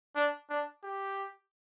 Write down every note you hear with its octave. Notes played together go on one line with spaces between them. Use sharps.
D4
D4
G4